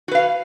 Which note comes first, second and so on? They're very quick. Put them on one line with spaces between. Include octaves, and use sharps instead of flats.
F#4 B4 F5